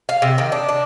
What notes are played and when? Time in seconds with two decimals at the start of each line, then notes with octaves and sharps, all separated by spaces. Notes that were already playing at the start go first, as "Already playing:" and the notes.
0.09 F5
0.22 C3
0.38 D#3
0.52 D4
0.69 D4